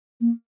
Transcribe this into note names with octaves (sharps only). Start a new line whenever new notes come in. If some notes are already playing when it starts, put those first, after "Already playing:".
A#3